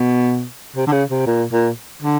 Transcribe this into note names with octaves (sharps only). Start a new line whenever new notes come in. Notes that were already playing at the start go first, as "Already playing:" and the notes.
Already playing: B2
C3
D3
C#3
C3
A#2
A#2
D3